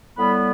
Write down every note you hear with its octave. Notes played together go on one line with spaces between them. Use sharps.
A2 G3 B3 B5